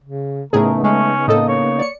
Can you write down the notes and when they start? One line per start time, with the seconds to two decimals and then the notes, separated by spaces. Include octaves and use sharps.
0.04 C#3
0.53 A2 C#3 A3 B3 D#4 G#4 A#4
0.84 G#3 A3 C#4
1.28 A2 A#3 A4 D#5
1.48 C#5
1.79 D5 C#7